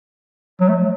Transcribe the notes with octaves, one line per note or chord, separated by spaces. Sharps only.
F#3
A3